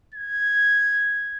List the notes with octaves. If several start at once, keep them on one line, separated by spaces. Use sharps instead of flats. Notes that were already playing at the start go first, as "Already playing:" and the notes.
G#6